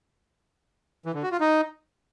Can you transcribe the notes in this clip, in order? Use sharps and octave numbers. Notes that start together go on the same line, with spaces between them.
E3
D3
F#4
F4
D#4